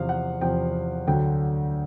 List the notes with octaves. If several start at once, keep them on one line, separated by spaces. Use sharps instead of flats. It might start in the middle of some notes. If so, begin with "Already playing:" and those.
Already playing: E2 C3 F3 F5
F#5
E2 C3 F3 G5
D2 D3 F#3 G5